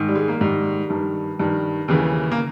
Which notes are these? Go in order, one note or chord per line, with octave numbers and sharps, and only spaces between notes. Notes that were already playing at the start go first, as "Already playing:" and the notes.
Already playing: G#2 D#3
G3
G#3
A#3
G#2 D#3 G3
G2 D#3
G2 D#3
D#2 C#3 E3
A#3